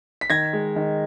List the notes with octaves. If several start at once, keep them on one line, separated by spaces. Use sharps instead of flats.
B6
D#3 G#6 A#6
G#3
D#3